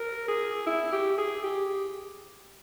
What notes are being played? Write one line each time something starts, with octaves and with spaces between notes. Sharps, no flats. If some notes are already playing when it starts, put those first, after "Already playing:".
Already playing: A#4
G#4
E4
G4
G#4
G4